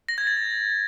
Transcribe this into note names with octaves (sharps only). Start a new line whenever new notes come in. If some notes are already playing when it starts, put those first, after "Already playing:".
A#6
G#6
A6